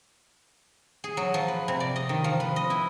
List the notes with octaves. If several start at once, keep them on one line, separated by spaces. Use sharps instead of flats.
G#4
F#3
F3
B4
C3
D5
D#5
D#3
F3
B4
D#5
E4